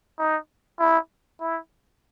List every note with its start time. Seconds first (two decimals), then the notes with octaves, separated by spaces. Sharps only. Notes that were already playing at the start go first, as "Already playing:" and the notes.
0.19 D#4
0.80 E4
1.40 E4